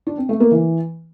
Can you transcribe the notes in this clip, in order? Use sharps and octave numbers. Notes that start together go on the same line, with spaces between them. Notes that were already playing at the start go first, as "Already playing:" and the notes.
D4
C4
A3
A#3
E3